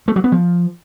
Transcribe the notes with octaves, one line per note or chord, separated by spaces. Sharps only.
A3
F#3
B3
F3